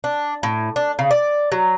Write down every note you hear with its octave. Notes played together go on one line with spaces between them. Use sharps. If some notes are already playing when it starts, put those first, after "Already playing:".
D4
A2
D4
C#3
D5
F#3